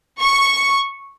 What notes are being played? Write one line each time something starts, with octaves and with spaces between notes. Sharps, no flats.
C#6